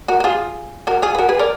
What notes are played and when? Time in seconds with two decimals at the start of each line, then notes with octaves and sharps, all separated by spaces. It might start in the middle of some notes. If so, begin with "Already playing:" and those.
0.08 F#4 A#4
0.20 F#4
0.24 F4 G#4
0.87 F#4 A#4
1.02 F4 G#4
1.15 B4
1.18 F#4 A#4
1.29 G#4 B4
1.39 A#4 D5